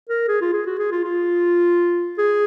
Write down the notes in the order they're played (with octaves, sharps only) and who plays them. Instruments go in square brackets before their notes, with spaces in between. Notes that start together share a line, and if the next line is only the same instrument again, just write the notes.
[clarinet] A#4
G#4
F4
G#4
F#4
G#4
F4
F4
G#4